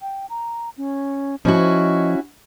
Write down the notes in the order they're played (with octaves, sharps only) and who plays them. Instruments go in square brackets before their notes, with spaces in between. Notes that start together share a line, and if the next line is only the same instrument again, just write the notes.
[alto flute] G5
A#5
C#4
[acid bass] F3 [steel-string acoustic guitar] C#4 E4 F#4 [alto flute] D#5